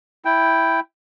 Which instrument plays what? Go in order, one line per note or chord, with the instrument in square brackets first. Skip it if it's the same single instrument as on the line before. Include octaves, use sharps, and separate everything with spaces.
[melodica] E4 G5